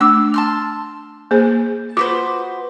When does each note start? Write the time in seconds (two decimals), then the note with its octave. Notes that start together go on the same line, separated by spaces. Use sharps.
0.01 A3 D4 D6 E6
0.34 A5 C6 F6
1.31 A#3 G#4 C5
1.97 F4 F#4 B4 C5 D6